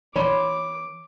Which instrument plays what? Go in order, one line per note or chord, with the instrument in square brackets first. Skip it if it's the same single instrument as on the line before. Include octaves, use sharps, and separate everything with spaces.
[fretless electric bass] E3 [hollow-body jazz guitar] C#5 B5 C6 [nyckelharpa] D6